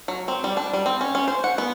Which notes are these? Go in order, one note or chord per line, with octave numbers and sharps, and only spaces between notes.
F#3
C4
G3
D4
G3
C4
C#4
C#4
C5
F#5
B3